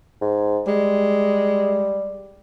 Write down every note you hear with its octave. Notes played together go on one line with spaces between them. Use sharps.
G#2
G3 G#3